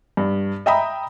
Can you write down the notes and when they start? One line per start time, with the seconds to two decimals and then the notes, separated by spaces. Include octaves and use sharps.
0.17 G2
0.66 D#5 E5 G5 A#5 B5 D#6